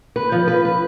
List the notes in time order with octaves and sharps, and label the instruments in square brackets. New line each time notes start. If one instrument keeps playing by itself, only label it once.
[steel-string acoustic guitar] B4
F3
B4
B4